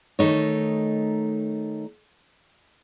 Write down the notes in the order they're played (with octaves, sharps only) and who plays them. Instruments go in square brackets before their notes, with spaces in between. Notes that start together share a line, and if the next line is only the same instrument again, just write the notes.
[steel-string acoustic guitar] D#3 A3 D#4 C#5